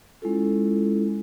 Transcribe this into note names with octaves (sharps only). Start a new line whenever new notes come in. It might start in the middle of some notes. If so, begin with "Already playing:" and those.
G#3 C#4 E4 F4 A4